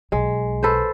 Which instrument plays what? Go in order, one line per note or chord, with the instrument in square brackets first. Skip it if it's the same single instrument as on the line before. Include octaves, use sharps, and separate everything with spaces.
[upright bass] B1 [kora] G#3
[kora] A4 B4 C5